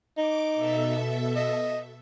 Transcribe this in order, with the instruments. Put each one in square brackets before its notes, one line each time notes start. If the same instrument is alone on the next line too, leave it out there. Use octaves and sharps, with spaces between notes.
[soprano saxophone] D#4 [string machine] D6
[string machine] B2 A4 E5
[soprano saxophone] D#5